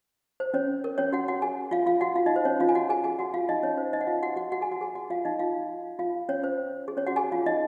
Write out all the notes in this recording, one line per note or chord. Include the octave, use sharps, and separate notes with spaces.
C5
C#4 C#5
A#4
C#4 C#5
F#4 F#5
F#4 F#5
G#4 G#5
F4 F5
F4 F5
F#4 F#5
F4 F5
D#4 D#5
C5
C#4 C#5
F4 F5
G#5
F#4 F#5
G#4 G#5
G#4 G#5
F#4 F#5
F4 F5
D#4 D#5
C#4 C#5
C5
D#4 D#5
F#5
F4 F5
F#4 F#5
F#4 F#5
F#4 F#5
G#4 G#5
F#4 F#5
G#4 G#5
F#4 F#5
F4 F5
D#4 D#5
F4 F5
F4 F5
C#4 C#5
C5
G#4
C#4 C#5
F#4 F#5
G#4 G#5
F4 F5
D#4 D#5